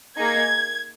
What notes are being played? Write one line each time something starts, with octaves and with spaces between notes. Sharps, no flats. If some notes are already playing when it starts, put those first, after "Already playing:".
A#3 D#4 G#4 G#6